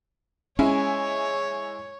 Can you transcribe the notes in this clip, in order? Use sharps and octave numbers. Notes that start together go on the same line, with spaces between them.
G#3 C#4 E4 C#5 G#5